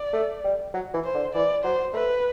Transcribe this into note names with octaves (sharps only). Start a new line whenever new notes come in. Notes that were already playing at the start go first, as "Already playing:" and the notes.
Already playing: D5
A3
G3
F#3
E3
C5
D3
E3 D5
F#3 C5
A3 B4